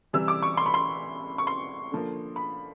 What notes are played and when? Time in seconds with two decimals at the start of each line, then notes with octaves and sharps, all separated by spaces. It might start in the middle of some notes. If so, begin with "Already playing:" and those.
0.13 C3 E3 G3 E6
0.28 D6
0.42 C#6
0.57 C6
0.66 B5
0.74 C6
1.38 C#6
1.47 C6
1.91 D3 F3 A#3
2.36 B5